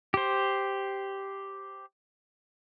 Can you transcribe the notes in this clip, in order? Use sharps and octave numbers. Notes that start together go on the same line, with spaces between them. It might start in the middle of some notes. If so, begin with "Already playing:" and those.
G4 C5